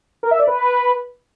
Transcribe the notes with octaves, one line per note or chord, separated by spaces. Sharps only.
A#4
E5
D5
B4